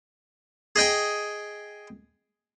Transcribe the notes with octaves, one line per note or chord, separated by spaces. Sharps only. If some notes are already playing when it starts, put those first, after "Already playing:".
G#4 D#5 G5 G#5